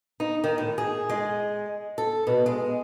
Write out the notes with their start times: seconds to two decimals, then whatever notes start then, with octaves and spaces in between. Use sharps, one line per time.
0.20 D#4
0.44 D#3
0.58 A2
0.78 G#4
1.10 G#3
1.98 A4
2.27 B2
2.46 G#3